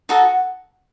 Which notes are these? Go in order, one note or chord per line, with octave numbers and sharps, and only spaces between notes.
D#4 F#4 A4 F#5